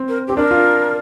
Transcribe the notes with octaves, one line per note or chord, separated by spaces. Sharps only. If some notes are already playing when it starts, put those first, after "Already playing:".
Already playing: C4
A#4
C4 G4
D4 A#4
F4